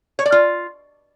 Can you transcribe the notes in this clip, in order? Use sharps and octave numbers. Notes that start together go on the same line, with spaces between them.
C#5
D5
F4